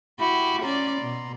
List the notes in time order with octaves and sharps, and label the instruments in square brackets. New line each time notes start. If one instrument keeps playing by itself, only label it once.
[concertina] E4 [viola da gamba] F#4 G4
[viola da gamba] C#4 D5 [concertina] A#5 C6
[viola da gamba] B2